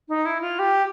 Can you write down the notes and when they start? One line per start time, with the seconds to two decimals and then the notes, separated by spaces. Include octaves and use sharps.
0.09 D#4
0.25 E4
0.41 F4
0.59 G4